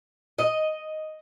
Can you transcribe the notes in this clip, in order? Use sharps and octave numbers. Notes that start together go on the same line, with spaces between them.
D#5